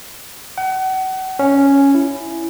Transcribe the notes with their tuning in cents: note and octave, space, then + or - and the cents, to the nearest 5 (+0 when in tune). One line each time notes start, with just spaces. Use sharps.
F#5 +35
C#4 +0
E4 +15